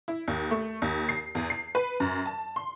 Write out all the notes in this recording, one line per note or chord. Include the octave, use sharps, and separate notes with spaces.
E4
D#2
A3
D#2
C7
E2
C7
B4
F#2
A5
C6